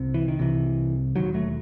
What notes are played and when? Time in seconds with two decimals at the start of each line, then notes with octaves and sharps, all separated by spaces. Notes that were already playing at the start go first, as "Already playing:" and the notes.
Already playing: C2 C3
0.14 E3
0.28 D#3
0.39 C2 C3 E3
1.16 E1 D#2 D#3 F#3
1.34 F#3 A3